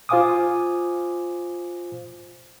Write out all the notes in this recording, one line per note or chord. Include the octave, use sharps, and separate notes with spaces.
F4 C5 F5 G#5 D6 D#6